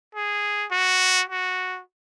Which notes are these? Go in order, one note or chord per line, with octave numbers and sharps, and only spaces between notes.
G#4
F#4
F#4